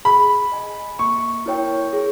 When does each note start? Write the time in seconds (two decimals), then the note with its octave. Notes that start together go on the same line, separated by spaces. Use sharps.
0.05 G#4 B5
0.52 D#5 G#5
0.99 A#3 C#6
1.46 E4 A#4 C#5 G5
1.93 G#4